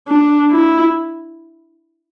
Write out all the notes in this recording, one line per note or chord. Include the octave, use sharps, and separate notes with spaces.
D4
E4